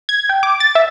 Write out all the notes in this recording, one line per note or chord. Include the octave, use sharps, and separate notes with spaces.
G#6
G5
D6
A6
E5